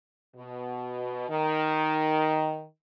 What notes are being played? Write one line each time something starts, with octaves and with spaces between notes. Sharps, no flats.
B2
D#3